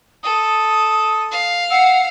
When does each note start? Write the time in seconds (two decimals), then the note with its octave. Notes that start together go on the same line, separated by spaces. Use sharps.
0.23 A4 D#6
1.32 F5
1.70 F#5 E6